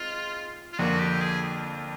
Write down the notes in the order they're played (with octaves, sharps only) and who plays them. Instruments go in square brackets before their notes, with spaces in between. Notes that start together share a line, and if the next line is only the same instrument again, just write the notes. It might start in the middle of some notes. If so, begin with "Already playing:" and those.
Already playing: [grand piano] G#3 C4 D#4 [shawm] F4
[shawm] F4
[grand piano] F2 D3 F3 A#3 [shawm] F#4
[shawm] G4
G#4